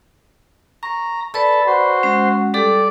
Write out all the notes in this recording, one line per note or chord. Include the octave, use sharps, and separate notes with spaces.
A#5 C#6
A4 B4 D5 B5
F#4 C5
G#3 C#4
G3 G4 A4 D5